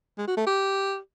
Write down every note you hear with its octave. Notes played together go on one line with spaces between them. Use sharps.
G#3
F#4
A3
G4